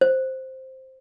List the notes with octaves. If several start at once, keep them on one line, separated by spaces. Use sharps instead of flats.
C5